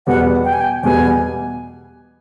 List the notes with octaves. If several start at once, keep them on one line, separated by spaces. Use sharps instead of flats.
E2 B2 G3 B3 F#5
G5
G#5
G5
E2 B2 G3 B3 G#5